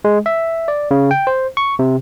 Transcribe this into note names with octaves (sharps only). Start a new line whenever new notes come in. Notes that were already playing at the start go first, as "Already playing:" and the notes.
G#3
E5
D5
C#3
G5
C5
C#6
C3